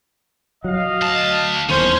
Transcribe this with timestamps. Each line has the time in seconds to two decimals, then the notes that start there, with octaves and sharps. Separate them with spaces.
0.64 F#3 D#5 F5
1.01 D2 A5
1.69 D#1 E2 D#3 C#4 C5